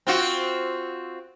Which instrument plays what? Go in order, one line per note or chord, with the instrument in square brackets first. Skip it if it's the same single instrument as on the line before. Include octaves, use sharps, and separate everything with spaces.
[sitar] C4 F4 F#4